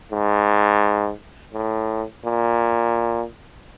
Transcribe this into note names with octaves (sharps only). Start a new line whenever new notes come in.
G#2
A2
A#2